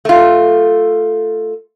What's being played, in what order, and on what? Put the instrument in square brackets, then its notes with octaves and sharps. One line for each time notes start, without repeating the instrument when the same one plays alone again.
[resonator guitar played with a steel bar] A3 F4